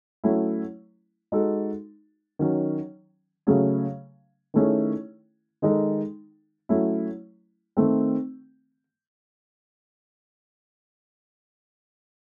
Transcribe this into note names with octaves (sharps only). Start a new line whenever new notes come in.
F#3 A3 C#4 E4
G#3 D#4 F#4 A4
D#3 F#3 C#4
C#3 F#3 A3 C#4 G#4
D#3 A3 C#4 E4 G#4
D#3 G#3 D#4 A4
F#3 A3 C#4 E4
D#3 A3 C4